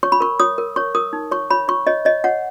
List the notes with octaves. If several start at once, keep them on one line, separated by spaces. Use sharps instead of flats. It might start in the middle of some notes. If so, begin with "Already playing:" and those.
C#5 C#6
B5
A#4 C#6
C#5 D#6
A#4
C#5 C#6
A#4 D#6
D#4
C#5 C#6
C#5 B5
C#5 C#6
C#5 D#5
C#5 D#5
C#5 F#5